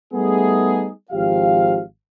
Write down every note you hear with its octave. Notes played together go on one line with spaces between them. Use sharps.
G3 A3 B3 D#4 G#4
G#1 F3 G4 F5